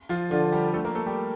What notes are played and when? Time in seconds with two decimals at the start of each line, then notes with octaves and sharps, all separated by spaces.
0.09 F3 F4
0.31 D3 F3 F4
0.52 G3 G4
0.74 A3 A4
0.84 A#3 A#4
0.95 A3 A4
1.06 G3 G4